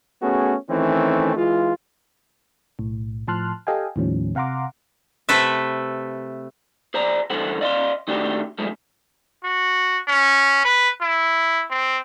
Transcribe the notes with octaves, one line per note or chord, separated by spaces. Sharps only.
A3 B3 C#4 F#4 G#4
D#3 E3 A3 C4 C#4
E3 G#3 F4
B1 A2
A2 F3 A5 C6 F6 F#6
G4 A4 D#5 F5 G5 G#5
D#2 A2 D#3 F3 G3 C#4
C3 F5 F#5 A#5 C6 D6
C3 A3 A4 B4 E5
G#4 C5 D5 A#5
G2 D3 E3 A4 C5 F#5
D5 D#5 F5 B5 C6
D#3 A3 D4 F#4 G4
G2 F3 G#3 A3
F#4
C#4
B4
E4
C4